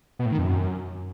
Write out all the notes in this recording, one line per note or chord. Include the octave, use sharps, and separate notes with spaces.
B2
A2
D#3
F2
F#2